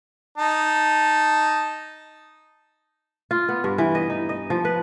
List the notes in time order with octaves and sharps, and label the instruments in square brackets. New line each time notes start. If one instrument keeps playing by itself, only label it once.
[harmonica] D#4 A5
[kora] F4
B3
G2
E3
D#5
D#4
D#5
F3
B4